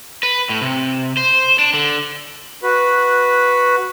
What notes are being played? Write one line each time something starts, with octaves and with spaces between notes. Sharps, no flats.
B4
A2
C3
C5
D4
D3
F#4 B4